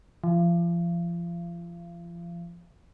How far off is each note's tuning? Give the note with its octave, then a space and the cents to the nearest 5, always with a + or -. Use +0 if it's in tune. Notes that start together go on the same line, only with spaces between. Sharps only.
F3 -35